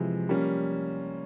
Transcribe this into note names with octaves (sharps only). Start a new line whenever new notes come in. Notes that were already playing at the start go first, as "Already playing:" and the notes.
Already playing: C3 E3 F3 G#3
G3 A#3 C#4